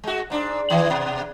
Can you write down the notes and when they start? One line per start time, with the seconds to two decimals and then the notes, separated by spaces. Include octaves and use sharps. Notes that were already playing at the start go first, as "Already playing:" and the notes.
0.04 G#3 F#4
0.30 G#2 D4
0.70 D#3 E3
0.90 B2